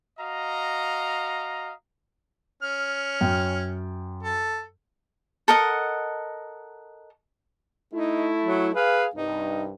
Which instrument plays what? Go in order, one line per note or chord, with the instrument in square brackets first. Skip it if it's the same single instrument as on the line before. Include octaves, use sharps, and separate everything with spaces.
[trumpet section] F#4 D#5 F5 A#5
[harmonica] C#4 F6
[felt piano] F#2 G5
[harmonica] A4
[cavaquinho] A4 A#4 D#5 F#5
[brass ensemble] A3 E4 [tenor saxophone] D#4
[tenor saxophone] F#3
[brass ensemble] G#4 F5 [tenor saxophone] B4
[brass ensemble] C2 G2 [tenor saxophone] D#4